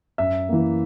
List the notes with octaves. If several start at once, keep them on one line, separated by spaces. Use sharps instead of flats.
F#2 E5
E3 A#3